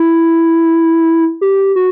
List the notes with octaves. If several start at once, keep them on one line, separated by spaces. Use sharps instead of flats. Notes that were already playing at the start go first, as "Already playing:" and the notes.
Already playing: E4
G4
F#4